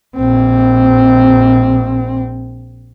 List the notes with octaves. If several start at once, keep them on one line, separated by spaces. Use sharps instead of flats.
A#1 C4